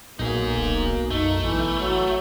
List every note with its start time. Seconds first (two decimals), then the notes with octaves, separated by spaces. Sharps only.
0.19 B1 A#2 A#3 D#4 G#4
0.56 D#1
1.10 F#2 A3 D#4
1.43 A1 E3
1.81 F#3